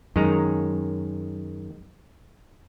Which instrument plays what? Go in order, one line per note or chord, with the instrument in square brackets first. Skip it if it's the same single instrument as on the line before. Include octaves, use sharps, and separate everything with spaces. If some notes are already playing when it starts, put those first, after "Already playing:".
[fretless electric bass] F#2 [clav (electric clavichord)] D#3 G#3 A#5